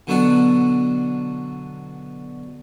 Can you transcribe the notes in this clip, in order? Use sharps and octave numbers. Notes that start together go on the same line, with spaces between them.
B2 D3 F#3 B3 D4 F#4